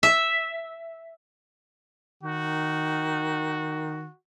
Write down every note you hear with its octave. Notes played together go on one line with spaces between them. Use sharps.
E5
D#3 F#4